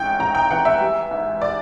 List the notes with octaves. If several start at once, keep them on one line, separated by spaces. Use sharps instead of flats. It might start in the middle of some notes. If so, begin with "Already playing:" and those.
Already playing: A1 G#2 F#5 G5
A1 A#5
G5
E3 F#5
E5
G3
G#2
D5